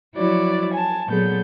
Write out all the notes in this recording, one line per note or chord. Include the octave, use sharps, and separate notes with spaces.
F3 F#3 E4 F#4 C#5 D5
G#5 A5
A#2 F#3 B3 G#4 A4 G6